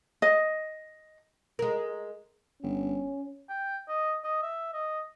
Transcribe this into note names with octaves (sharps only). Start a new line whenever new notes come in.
D#5
G#3 A#4
G1 C#4
G5
D#5
D#5
E5
D#5